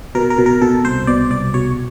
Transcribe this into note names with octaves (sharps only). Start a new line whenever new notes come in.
B2 A#4
A#4
B2
A#4
B2 A4
C2 C5
B2 D5
C2 D5
B2 C#5